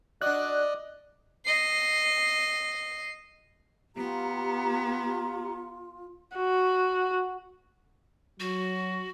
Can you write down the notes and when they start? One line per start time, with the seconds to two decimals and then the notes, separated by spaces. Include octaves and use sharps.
0.21 D4 F#4 D5 D#5 F#6
1.46 D#5 C7
3.96 B3 F4 G4 A#5
6.37 F#4
8.40 F#3 F#4